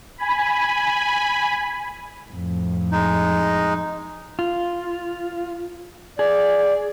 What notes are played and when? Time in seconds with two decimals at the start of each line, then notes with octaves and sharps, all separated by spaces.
0.18 G#5 B5
2.29 F2 A2
2.92 G#3 D#4
4.39 F4
6.19 G#4 D5